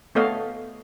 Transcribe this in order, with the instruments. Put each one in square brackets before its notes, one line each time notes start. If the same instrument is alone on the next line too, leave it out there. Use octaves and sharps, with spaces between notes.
[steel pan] A3 B3 A4 C#5 D#5 F5